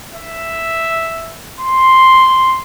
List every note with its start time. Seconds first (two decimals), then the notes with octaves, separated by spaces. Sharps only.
0.14 E5
1.60 C6